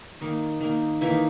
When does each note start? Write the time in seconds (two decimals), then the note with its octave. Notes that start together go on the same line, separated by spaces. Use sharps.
0.21 D#3 A#3 D#4
0.61 D#3 A#3
1.01 D#3 E3 A#3 E4
1.11 D#4